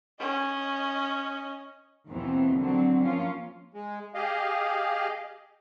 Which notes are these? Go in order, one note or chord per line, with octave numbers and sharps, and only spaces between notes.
C#4 D#5
D#2 B2 D#3 E3 C4
D3 F#3 C4
F3 A#3 C#4 F4
G#3
G4 G#4 D#5 F5